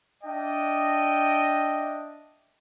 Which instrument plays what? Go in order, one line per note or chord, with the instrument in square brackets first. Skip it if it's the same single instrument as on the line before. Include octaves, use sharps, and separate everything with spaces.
[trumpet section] D4 D#5 E5 G5